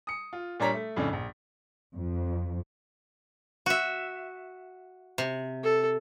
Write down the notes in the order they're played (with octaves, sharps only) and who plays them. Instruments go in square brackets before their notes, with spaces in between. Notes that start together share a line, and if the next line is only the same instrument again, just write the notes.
[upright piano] D#6 C#7
F4
A#2 G3 D4 C#5 A#5 B6
A3
F2 A2 C#3 C#4 D4
A#1
[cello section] F2
[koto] F#4 E5
C3
[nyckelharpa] A4